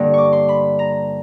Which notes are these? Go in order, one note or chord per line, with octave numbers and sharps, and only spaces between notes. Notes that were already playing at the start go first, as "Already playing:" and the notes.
Already playing: G2 D3 G3 A#3
C#6 D6
C6
B5
A#5